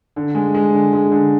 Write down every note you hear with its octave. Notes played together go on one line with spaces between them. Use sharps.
D3
G#3
G#3
D3
G#3
D3